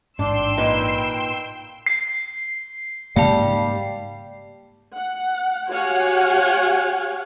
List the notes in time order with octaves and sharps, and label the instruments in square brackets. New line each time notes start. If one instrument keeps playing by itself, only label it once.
[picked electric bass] A1 G#2 [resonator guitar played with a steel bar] D4 [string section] G5 C6 E6
[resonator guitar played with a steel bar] A#2 D#4 B4
[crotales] C7
[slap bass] G#2 C#3 A#3 [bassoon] G3 [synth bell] F5 A5
[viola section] F#5
F#4 G4 C#5 F5 F#5 G#5